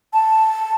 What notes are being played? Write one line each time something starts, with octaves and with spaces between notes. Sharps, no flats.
A5